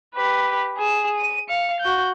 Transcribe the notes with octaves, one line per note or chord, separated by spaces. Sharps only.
G4 B4
G#4 E7
D#7
F5 C#7
F#4 G6